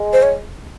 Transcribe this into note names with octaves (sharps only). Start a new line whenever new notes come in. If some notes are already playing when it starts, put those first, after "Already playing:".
Already playing: G#3
C5
C#5